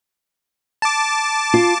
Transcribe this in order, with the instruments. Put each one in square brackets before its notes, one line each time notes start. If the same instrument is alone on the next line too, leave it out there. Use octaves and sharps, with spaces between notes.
[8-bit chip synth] A5 D6
[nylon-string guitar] F4